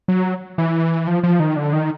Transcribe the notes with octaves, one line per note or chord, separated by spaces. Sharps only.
F#3
E3
F3
F3
D#3
D3
D#3